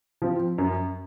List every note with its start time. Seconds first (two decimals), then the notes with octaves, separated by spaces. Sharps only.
0.22 F3 C4
0.58 F#2